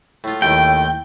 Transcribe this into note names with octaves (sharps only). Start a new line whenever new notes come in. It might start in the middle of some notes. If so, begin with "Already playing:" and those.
A2 F4
D#2 A2 D#3 G5